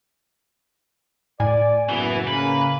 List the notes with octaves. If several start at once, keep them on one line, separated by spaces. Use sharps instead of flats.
A2 D5 G#5
F#1 E3 B3
C#3 A#3 B4